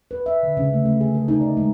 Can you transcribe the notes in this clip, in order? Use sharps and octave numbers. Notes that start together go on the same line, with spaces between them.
B4
E5
D3
C#3
A3
A3
G#4
A4
D#4
D5
G#3